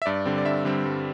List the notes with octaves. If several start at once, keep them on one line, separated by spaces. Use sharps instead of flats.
E5
G2 D5
D3 G3 C4
D5
G2 E5
D3 G3 C4
G2